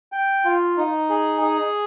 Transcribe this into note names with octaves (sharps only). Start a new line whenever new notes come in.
G5
F4
D#4
G#4
G#4